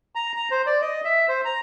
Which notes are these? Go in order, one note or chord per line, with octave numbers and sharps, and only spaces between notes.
A#5
A#5
C5
D5
D#5
E5
C5
A#5